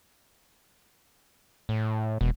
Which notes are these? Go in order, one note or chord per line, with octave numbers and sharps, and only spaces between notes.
A2
E1 B2